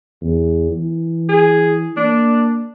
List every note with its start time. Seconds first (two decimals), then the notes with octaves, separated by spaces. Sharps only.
0.21 E2
0.71 E3
1.29 G#4
1.97 A#3 D4